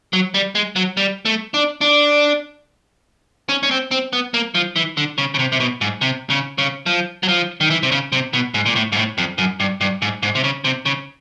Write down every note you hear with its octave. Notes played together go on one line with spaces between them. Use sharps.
F#3
G3
G#3
F#3
G3
A3
D4
D4
C#4
C#4
C4
C4
B3
A#3
F3
E3
D3
C#3
C#3
C3
C3
B2
G#2
C3
C#3
C#3
F3
F#3
F3
D#3
E3
C3
C#3
C3
B2
G#2
A#2
A2
G#2
A2
F2
F#2
G2
G2
G#2
G#2
C3
C#3
C3
C#3